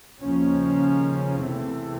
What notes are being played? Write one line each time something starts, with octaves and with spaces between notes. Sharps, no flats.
D#2 C#3 F3 A#3 C#4
E2 C3 E3 A3 C4